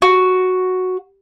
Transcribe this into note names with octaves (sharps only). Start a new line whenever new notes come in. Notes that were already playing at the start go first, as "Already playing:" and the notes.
F#4